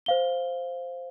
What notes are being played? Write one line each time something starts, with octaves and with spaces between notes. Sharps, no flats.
C5 F5 G7